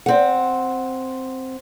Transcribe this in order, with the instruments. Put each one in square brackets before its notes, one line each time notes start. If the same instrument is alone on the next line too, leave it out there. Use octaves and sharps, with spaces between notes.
[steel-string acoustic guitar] C4 F#5